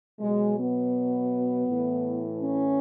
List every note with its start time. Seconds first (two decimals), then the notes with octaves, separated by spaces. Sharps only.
0.20 B2 F#3 G#3
0.58 B3
1.67 A2 E3
2.40 C#4